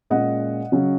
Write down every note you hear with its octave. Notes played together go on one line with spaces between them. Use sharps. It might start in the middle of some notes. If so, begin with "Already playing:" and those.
A#2 G#3 C#4 D#5 F#5
C#3 F#3 C#4